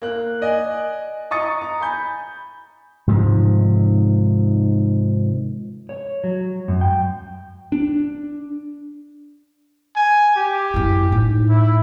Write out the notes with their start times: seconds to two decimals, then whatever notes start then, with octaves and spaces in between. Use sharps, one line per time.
0.02 A#3 F#6
0.41 D5 D#5 G#5
1.31 D#5 A#5 C#6 D#6 A6 C#7
1.61 A#5
1.80 G#5 B5 G6
3.07 G#2 C3 D#3 F3
5.89 C#5
6.24 F#3
6.68 F#2
6.81 G5
7.72 D4
9.96 G#5
10.36 G4
10.74 F#2 E4
11.12 A2 D#4
11.49 E4